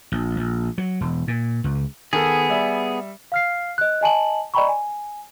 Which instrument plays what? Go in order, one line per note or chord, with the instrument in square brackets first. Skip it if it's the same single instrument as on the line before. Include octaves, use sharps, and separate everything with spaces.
[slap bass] A#1
A#1
F#3
E1
A#2
C#2
[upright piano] D#3 A4 [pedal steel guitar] B3 G#4
[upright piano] G3 E5
[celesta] F5 F6 C7
D#5 F#6
D#5 G#5 A5 F#7
D5 D#5 G5 A#5 B5 C#6
G#5